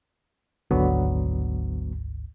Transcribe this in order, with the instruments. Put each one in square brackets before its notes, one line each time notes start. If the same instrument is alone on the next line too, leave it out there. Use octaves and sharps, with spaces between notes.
[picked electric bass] G#1 D2 G#2 [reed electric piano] D3 F#3 B3